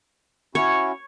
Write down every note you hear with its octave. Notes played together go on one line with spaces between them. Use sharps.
C#4 E4 F#4 C#5